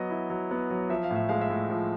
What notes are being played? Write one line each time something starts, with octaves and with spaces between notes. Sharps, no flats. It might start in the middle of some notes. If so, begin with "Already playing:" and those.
Already playing: F#3 B3 D#5
E4
F#3
B3
F#3
F3 E5
F5
A2 E5
G#3 F5
E5
A2
F3